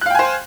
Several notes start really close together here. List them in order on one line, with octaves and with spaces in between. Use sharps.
F#6 F5 G5 G#5 C5